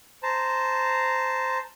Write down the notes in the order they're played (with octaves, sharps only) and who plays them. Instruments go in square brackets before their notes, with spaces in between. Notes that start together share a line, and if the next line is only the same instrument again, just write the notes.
[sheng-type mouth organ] C5 A5 A#5